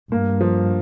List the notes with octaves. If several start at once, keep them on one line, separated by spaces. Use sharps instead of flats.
G2 A#3
F3